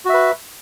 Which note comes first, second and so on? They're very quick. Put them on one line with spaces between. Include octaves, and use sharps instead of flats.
F#4 E5 B4